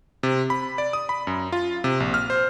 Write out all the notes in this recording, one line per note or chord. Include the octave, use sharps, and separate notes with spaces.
C3
B5
D5
D#6
B5
F#2
F4
C3
A#1
F6
C5